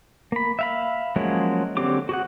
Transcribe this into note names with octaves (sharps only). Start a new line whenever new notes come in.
A#3 B5
E5 F5 B5
F3 F#3 G#3 A#3 C#4
D3 F#3 C4 G4 D6
F#4 G#4 F#5